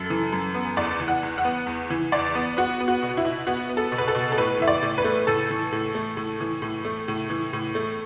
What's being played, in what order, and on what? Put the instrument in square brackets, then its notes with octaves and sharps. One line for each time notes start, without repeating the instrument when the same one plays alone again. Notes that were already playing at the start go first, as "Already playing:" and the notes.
Already playing: [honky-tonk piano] F#2 A4
E3
F#2
B3
E2 D5
E3
F#5
E2
F#5
B3
E2
E3
E2 D5
B3
B3 F#4
B3
F#4
B2
E4
B2
B3 F#4
B3
A4
B2
B4
A4
B2
A4
A2 B4
E3 E5
D5
A2
B4
A3
A2 A4
E3
A2
A3
A2
E3
A2
A3
A2
E3
A2
A3